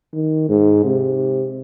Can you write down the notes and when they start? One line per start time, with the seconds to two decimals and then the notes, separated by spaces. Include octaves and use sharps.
0.13 D#3
0.49 G#2
0.84 C3